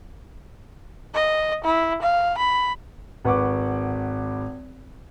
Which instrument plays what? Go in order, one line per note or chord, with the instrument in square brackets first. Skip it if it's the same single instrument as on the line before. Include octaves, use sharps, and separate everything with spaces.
[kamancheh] D#5
E4
F5
B5
[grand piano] G#1 B4 F#5 C#6 D6